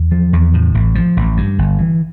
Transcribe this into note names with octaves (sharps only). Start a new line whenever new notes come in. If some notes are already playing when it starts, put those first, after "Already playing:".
Already playing: E2
F3
E2
A2
A1
F3
A1
G2
G1
E3